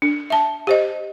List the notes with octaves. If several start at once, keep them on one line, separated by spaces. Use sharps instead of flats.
D4
E5 A5
G4 C5 D#5